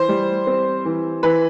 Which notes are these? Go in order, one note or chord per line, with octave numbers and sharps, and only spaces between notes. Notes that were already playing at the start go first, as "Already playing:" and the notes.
Already playing: E3 C5
G3
C4
E3
E3 B4